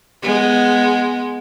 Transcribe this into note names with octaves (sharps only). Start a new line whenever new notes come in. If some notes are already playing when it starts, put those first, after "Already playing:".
G#3 B3